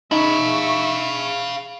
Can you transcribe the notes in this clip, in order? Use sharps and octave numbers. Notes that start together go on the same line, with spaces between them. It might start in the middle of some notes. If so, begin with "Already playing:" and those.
D#4 E5 F5 B5 C#6